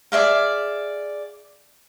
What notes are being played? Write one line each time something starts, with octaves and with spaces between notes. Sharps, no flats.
G#4 D5 E5 F5